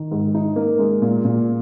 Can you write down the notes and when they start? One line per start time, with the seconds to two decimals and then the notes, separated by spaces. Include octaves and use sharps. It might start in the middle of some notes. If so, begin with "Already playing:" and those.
Already playing: D#3
0.11 G#2
0.35 D#4
0.56 A#3
0.79 G#3
1.02 A#2
1.25 A#2